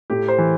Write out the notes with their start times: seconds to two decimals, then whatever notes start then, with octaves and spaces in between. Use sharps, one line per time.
0.10 A2 G4
0.28 C5
0.38 E3